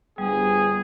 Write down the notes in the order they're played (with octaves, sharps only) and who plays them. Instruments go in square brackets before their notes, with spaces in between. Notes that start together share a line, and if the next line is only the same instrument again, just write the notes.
[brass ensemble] G1 B3 G#4 [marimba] G3